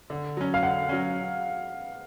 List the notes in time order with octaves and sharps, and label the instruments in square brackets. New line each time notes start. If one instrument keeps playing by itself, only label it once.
[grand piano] D3
F#3 C#4
[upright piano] F5
[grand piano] D3 [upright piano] F#5
[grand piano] F#3 C#4